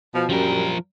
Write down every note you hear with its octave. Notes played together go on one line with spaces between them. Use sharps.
B2 F3
F#2 F3 G3 A#4